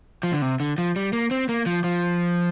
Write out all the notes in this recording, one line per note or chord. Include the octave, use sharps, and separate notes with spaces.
F3
D3
C3
D3
F3
G3
A#3
C4
A#3
F3
F3